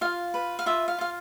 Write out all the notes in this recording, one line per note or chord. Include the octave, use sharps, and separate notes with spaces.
F4 F5
B4
F5
F4 E5
F5
F4 F5